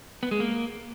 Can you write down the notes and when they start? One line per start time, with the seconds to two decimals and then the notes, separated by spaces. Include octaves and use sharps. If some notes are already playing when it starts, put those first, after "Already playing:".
0.23 B3
0.31 G#3
0.40 A#3